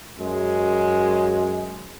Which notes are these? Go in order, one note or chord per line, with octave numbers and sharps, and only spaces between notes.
F#2 G#3